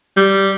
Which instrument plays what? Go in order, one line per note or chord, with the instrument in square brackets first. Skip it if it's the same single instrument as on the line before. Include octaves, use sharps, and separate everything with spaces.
[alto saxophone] G3